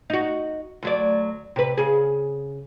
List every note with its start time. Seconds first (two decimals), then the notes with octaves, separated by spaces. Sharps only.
0.10 D#4 F#4
0.83 D2 F#3 D5
1.56 C3 B4
1.77 C#3 G#4